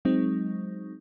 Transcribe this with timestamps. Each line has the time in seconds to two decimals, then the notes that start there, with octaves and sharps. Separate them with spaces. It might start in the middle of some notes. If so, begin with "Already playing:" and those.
0.05 F#3 G#3 C4 D#4